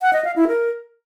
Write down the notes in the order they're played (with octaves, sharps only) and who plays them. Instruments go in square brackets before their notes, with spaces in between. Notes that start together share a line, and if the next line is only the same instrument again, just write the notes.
[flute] F#5
D#5
F5
E4
A#4